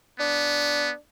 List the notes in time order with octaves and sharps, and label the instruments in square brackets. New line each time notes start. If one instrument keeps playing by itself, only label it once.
[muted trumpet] B3 [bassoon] D4